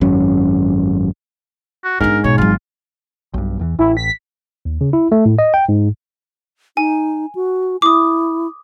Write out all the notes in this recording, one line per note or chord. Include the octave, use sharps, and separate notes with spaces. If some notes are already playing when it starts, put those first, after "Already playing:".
G#1 F#2 C#4
F#4
G#2 B3 D4 A#4
B2 C#5
G#1 F#3 F4
B1 G2
E2 D#3 E3
A1 E4
B6
D#2
C#3
E4
A3
A2
D#5
G5
G#2
D#4 G#5
F#4
E4 D6 D#6